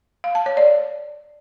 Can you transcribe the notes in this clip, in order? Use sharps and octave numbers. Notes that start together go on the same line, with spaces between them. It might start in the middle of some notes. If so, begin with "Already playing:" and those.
F5
A5
C#5
D5